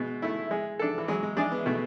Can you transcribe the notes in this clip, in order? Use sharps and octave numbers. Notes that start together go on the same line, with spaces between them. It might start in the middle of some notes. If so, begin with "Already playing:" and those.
Already playing: B2 G#3
A3 E4
G#3
D4 A4
E3
F#3 G#3
G#3
G#3 D4 G#4 D5
B3
B2 A3